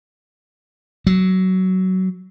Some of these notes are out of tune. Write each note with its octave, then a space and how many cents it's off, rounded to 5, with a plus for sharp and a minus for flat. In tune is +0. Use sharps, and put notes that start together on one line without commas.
F#3 +15